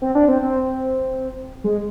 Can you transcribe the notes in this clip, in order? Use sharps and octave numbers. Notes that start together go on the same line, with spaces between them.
C4
D4
C4
C4
G#3